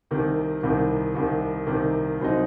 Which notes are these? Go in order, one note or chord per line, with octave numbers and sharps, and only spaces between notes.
C2 C3 D#3
C2 C3 D#3
C2 C3 D#3
C2 C3 D#3
C2 C3 F#3 C4 D#4